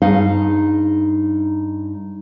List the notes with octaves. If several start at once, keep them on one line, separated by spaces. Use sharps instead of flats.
G2 D#4 G#4 F5